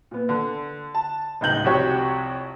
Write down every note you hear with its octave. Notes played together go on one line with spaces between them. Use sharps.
A#2 B3
D3
A5
D1 C#2 D#4 G6 F#7
C2 F2 F#4 G4 C#5